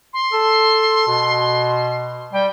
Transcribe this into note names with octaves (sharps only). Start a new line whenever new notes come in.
C6
A4
B2
G3 G5